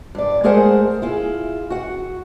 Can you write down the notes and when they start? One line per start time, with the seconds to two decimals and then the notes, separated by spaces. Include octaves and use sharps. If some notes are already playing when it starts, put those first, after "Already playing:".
0.15 G2 D5
0.43 G#3 A3 G#4 A#4 C5 F#5
1.02 E4 F4 G#4
1.70 F#4 F#5